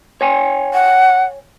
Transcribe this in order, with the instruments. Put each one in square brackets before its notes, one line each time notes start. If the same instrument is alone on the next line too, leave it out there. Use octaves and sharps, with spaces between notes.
[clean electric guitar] C#5 G5 G#5
[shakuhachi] F#5